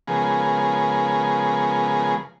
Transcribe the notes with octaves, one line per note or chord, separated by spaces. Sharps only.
C#3 F3 G#3 B3 G#4 A#4